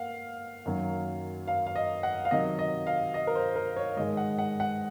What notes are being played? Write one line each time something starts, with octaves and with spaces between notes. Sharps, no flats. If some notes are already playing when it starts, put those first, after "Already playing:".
Already playing: A#3 F5 F#5
F#2 D#3 F#3 A#3
F5
F5
D#5
F#5
F5
C3 D#3 F#3 D#5
D#5
F5
D#5
A#4
C5
A#4
C#5
G#2 D#3 G#3 D#5
F#5
F#5
F#5